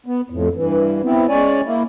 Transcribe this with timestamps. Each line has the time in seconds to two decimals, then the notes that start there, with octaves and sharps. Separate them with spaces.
0.06 B3
0.30 F2 A2
0.54 G2 E3
1.03 B3 C4 E4
1.29 G#3 C#4 C#5 D5 G#5
1.65 A#3 E4